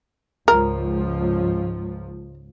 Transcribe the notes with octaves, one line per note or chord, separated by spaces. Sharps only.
C#2 G#2 F3 A#4